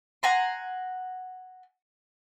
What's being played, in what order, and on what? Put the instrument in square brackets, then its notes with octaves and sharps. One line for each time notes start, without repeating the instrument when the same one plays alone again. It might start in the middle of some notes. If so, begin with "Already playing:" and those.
[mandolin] F#5 G#5 A#5 C6